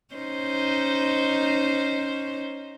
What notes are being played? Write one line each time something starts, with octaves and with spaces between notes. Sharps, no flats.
C#4 D#4 C5